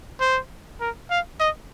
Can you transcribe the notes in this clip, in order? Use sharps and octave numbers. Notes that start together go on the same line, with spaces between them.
C5
A#4
F5
D#5